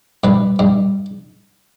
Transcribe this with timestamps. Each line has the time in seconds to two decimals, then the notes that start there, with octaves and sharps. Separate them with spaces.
0.24 G2 B4
0.59 G2